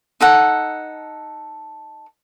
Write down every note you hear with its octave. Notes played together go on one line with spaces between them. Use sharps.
D#4 A4 F#5